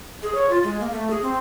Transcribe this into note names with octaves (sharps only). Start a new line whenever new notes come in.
G#4
C#5
F4
G#3
A#3
A3
G#4
C4